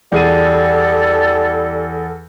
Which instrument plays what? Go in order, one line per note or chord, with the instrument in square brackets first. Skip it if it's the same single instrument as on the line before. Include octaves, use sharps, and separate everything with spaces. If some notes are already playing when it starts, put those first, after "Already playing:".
[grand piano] E2 G#4 D#7 [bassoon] G3 [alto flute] A4